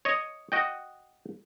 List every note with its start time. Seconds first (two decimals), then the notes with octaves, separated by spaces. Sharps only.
0.05 C#5 D#5
0.52 F#4 D#5 G5